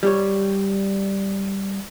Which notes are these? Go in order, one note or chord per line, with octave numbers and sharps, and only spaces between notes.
G3 G4 C#5